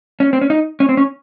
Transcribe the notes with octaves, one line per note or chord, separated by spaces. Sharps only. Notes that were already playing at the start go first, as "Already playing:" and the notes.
C#4
C4
C#4
D#4
C#4
C4
C#4